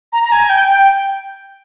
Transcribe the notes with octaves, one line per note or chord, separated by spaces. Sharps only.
A#5
A#5
G#5
G5
G5